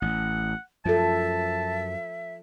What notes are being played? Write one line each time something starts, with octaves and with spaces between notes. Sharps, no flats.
A1 F#5
F#2 F3 A4 E5 A5